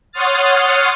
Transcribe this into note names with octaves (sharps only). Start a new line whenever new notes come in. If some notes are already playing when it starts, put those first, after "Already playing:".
C#5 F#5 C6 D#6 F6 A6